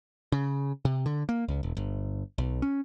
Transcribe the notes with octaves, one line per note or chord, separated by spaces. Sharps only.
C#3
C3
D3
A#3
C#2
E1
G1
B1
C#4